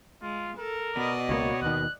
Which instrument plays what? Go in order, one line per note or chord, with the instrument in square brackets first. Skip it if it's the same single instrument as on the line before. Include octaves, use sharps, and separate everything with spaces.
[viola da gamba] G#3 [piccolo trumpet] F4
[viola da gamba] A4 [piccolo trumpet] A#4
[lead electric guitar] B2 [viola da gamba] D5 D#5
[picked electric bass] C#2 F3 A#3 [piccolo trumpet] C#5
[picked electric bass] D#2 D#3 [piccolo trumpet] F#6